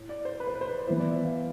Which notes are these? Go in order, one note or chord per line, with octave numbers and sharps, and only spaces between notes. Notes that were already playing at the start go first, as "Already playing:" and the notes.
Already playing: A2
D5
C5
B4
C5
B4
C5
B4
E3 B3 E4 C5
D5
E5
F5
E5